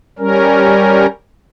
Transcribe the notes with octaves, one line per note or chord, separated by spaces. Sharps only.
G3 C#4 A#4